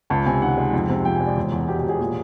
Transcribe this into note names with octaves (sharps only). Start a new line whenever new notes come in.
C#2 A5
C3 G#5
D#3 F#5
G#3
F2
C3
F3 G5
G#5
G#3
D5
E1
E2
B2 G4
G4
E1
G#4
A#2